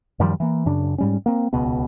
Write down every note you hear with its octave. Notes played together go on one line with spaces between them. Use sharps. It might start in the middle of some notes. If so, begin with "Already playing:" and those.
F#2 D#3 F3 G3
E3 A#3
F#2 C#3 D4
G#2 G3 C#4
A#3 C4
D#1 C#2 B2 B3